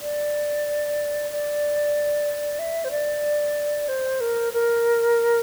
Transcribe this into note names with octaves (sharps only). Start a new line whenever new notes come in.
D5
D5
E5
C5
D5
C5
A#4
A#4